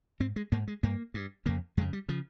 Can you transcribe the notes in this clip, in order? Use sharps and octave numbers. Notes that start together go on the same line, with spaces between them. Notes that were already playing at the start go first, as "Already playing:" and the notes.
G#2 C4
G#3
G#2 A#3
G#3
G2 A#3
G2
F2 C#3 A#3
F2 C#3 G#3
G3
C#3 F3